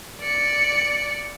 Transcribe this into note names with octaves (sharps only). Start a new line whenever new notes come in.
D5 C#7